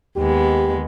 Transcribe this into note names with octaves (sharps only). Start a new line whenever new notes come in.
D#2 G#3 B3 G4